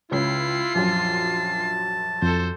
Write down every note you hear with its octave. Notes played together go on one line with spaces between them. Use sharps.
C#2 C#3 E4 F4 C7
A#1 F#2 A5
F2 A4 C5